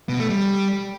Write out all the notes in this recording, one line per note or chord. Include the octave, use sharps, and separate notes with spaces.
B2
A3
G3